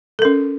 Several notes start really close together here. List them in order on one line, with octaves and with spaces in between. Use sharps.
A4 A#4 C#4